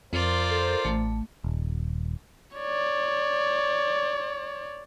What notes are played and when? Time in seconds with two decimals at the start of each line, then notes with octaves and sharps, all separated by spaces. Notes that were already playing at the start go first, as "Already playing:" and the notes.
0.13 F2 F4 A#4 C5 D5
0.50 A4
0.85 A1 A3
1.44 D#1
2.57 C#5 D5